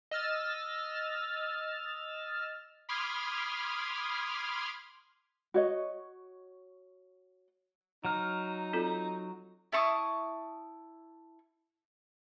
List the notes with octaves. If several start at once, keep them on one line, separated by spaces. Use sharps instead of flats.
D#5 E6 F6 A6
B5 C6 D6 D#6 F6 G#6
F#4 C#5 D#5
F#3 D#4 F6
C4 F4 A4
E4 A5 C#6 D#6